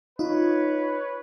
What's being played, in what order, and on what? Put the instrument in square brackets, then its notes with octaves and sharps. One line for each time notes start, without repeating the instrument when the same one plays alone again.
[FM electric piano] D#4 F4 [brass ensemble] B4 C#5